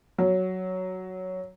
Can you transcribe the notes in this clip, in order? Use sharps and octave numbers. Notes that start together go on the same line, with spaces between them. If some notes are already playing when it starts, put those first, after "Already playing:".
F#3